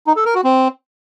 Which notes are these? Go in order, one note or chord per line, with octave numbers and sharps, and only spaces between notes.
D#4
A4
A#4
F#4
C4